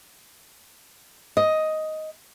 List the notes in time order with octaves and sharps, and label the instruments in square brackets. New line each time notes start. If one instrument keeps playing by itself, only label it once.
[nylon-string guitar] D#5